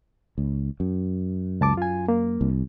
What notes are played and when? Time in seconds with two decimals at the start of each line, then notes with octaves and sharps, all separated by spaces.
0.38 C#2
0.80 F#2
1.61 C#2 A5 D6
1.77 F4 G#5
2.08 A#3
2.41 C2